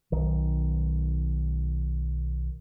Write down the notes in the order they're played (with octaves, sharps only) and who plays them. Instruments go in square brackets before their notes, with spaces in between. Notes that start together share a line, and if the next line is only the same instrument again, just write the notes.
[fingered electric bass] B1 D#3